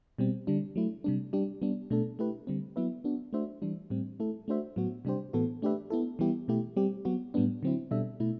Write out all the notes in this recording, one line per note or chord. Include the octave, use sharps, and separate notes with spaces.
B2 G3 C4
D3 G3 D4
F#3 A3 E4
C3 G3 D4
G3 D4 G4
G3 B3 D4
B2 A3 D4 A4
A3 E4 G4 B4
D3 G3 C4
F#3 B3 E4 B4 E5
B3 D4 F#4
A3 D4 F#4 C5 E5
E3 G3 D4
A2 G3 C4
A3 E4 A4
A3 D4 F#4 C5 E5
A2 F#3 B3 F#4
C3 G3 D4 G4 C5
A2 E3 B3 F#4 A4
A3 D4 G4 B4 E5
B3 E4 A4
E3 G3 B3 E4 G4
B2 A3 E4 G4
G3 C4 G4
F#3 B3 F#4
A2 G3 B3 D4
D3 F#3 C4 E4
B2 G3 D4 A4 E5
B2 A3 E4